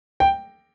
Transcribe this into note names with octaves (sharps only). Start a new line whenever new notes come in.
G5